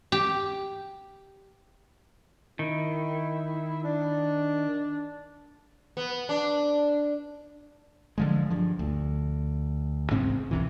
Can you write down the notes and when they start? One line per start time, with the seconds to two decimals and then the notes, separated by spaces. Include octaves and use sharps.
0.12 G4
2.59 D#3 E4
3.84 D4
5.97 B3
6.29 D4
8.18 D3 F3 G#3
8.50 G2 F3
8.79 D2
10.11 A1 G#2 C#3 C4
10.51 C2 C3 E3